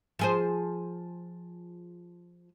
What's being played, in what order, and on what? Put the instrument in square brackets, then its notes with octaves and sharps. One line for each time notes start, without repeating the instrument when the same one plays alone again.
[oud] F3 G#4 C5